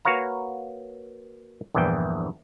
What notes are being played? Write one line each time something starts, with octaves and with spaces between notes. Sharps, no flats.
A#3 F#4 B4 C#5 F5 A#5
A#1 E2 G2 E3 G3 G5